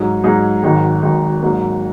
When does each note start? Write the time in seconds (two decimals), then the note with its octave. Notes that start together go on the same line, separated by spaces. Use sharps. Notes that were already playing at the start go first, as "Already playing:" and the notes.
Already playing: G#2 F#3 D#4 G#4
0.23 G#2 F#3 D#4 G#4
0.63 G#1 G#2 D#3 F#3 D#4
1.02 G#1 G#2 D#3 F#3 D#4
1.42 G#2 F#3 A#3 D#4